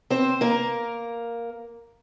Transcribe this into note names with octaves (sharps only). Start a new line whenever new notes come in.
C4 C5
A#3 A#4